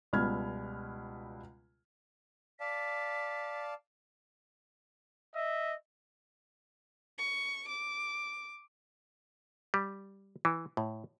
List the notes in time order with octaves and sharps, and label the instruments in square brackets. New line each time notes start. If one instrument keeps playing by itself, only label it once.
[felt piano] C#2 B2 G3 B5 F6 G#6
[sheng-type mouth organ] D5 F5 A5 [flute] B6
[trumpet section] D#5 E5
[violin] C#6
D6
[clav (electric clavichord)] G3
E3
A2